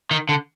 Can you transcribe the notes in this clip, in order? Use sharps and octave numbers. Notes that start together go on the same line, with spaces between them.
D#3
D3